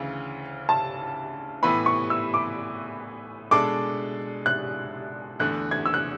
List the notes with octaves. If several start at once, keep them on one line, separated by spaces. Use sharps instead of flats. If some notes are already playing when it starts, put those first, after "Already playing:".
Already playing: D2 C#3 E3
A5
A2 E3 B3 E4 B4 B5
C#6
E6
D6
B2 G#3 D4 A4 D6
F#6
E2 D3 A3 F#6
G#6
E6
F#6